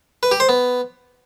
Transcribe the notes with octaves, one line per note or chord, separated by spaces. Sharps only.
B4
G4
C5
B3